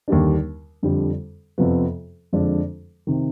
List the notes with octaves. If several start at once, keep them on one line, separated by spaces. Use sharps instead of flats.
D#2 D3 G3 D4
F2 D3 G3
F2 C3 F3 B3
F2 D3 F3 G#3 D4
C3 D#3